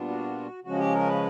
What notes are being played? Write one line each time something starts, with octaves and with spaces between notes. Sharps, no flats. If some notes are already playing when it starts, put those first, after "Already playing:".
Already playing: A#2 G3 B3 D4 F4
F#4
C#3 F3 G#3 C#4 F#4
G4
A#4
B4